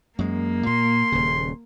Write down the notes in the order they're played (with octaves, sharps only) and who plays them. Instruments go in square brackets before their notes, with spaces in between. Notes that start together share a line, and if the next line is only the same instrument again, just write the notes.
[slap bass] F#2 G#3 [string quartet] A#3
[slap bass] A#2 [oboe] C6
[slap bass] D#1 C#3